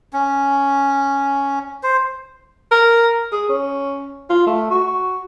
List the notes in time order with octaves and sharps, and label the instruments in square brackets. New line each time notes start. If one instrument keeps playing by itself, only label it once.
[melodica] C#4
C5
[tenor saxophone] A#4
G#4
C#4
F4
A3
F#4